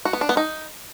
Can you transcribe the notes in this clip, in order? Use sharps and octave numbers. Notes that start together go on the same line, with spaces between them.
F#4
B3
D4
B3
D#4